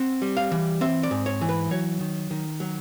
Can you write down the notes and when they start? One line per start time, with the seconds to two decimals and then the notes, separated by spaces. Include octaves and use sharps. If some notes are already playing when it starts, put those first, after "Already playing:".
Already playing: C4 F#5
0.22 G3
0.37 F5
0.52 E3
0.81 C4 E5
1.03 D5
1.11 G#2
1.26 C#5
1.41 E3
1.49 B4
1.71 F#3 C#5
2.00 D#3
2.31 D#3
2.60 F#3